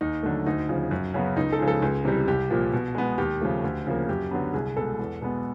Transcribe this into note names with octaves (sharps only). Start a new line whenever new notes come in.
D#2 D#4
D3 F#3 A3
D2 D#4
C#3 F3
F#2
C#3 F#3 B3
C#2 D#4
A4
C#3 F3 G#3
A4
C#2 G#4
C3 E3 G3
C2 G4
A#2 F3 A#3
B2
G#3 B3
D#2 G4
C#3 F3 A3
D2
C#3 F3 A#3
F#2 G4
D3 F#3 B3
C2 G#4
B2 G#3 B3 A4
E2
B2 G#3 B3